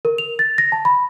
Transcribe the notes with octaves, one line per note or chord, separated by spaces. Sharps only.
A#4
F7
A6
A#6
A5
B5